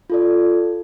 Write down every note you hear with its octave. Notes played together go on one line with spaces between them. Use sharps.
F4 A4 D5